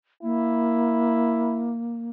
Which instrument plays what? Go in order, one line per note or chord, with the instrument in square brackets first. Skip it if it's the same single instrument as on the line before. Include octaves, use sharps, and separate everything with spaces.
[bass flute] A#3 [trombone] E4